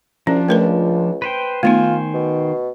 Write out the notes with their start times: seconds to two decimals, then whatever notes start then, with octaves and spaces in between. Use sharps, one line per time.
0.27 C2 F3 C#4 D4
0.48 C#2 A3 A#4 B4
1.22 B4 C5 G5
1.63 D#3 A3 B3 D#4 F4 C5 G#5
2.14 B2